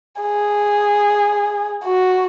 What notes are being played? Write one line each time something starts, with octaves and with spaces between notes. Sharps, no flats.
G#4
F#4